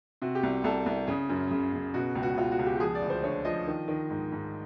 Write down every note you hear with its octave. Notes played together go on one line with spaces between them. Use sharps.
C3 F#4
G4
C2
C2 A4
C2
C#3 G#4
F#2
C#3
C#3
B2 F#4
C#2
F#4
C#2 F4
F#4
C#2
G4
G4
F3 G#4
D5
D2
C5
D3 C#5
F3 D#5
D#3
D#3
G#2
G#2